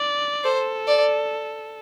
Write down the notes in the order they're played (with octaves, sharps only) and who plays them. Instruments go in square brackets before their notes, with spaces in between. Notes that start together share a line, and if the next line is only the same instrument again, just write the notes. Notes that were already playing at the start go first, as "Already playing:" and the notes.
Already playing: [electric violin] D5
[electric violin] A4 [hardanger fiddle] C5
[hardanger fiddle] D5